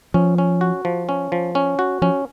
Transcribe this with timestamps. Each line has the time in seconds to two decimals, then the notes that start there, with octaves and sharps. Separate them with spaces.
0.14 F3 C#4
0.38 C#4
0.61 F#4
0.85 F3
1.09 C#4
1.32 F3
1.55 C#4
1.79 F#4
2.02 F3 C#4